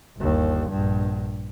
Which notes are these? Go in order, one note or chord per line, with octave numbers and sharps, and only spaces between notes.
G1 D#2
A#1 G2